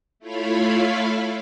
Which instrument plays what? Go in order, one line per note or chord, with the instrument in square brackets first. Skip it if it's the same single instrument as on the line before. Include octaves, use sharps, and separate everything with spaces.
[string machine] A3 E4 F4 C#5 F5 B5